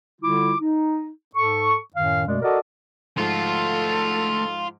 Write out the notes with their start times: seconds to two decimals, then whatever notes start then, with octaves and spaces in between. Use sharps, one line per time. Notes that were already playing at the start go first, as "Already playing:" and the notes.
0.21 D3 G3 E4 F4 D6
0.59 D#4
1.35 G#2 A4 C#6
1.94 F#2 A2 D#3 C#4 F5
2.26 F#2 B2 G#3 A3 D5
2.42 F#4 A4 A#4 D5 D#5
3.17 G#2 F3 A3 F4 F#4 A4 C6